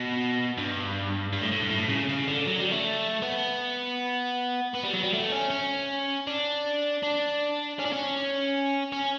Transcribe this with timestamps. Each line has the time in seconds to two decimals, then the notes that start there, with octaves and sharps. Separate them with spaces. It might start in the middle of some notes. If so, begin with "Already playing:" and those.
Already playing: B2
0.58 G2
1.33 G2
1.42 A2
1.52 A2
1.61 G2
1.70 A2
1.89 C#3
2.09 C#3
2.28 D3
2.47 F#3
2.59 G3
2.72 A3
3.22 B3
4.75 B3
4.84 G3
4.93 F#3
5.03 G3
5.13 A3
5.32 C#4
5.50 C#4
6.27 D4
7.03 D4
7.79 C#4
7.85 D4
7.93 C#4
8.92 C#4